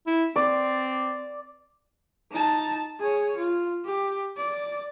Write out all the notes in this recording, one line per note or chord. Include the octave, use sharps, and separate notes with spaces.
E4
C4 D5
D#4 A5
G#4 C#5
F4
G4
D5